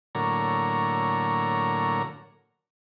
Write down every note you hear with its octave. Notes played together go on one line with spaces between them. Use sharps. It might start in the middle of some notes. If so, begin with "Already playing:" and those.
A2 D3 F#3 A#3 C#5 A#5